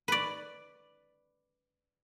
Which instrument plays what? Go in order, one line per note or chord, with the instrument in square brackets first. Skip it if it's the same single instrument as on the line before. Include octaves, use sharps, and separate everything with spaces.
[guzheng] B4 D5